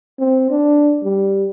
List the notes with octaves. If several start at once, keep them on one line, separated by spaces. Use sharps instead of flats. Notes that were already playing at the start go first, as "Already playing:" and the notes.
C4
D4
G3